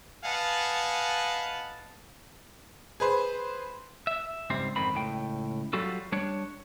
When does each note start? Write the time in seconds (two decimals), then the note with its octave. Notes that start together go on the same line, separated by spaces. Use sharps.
0.24 B4 D#5 F5 F#5 G#5 A5
3.00 G#4 B4 C5
4.07 E5
4.50 C#2 G#2 G3 C4 C5
4.76 F2 G#2 D#3 C4 B5
4.94 C#2 A2 G5
5.73 F#3 G3 F4 F#4 A4
6.12 G3 D4 C#5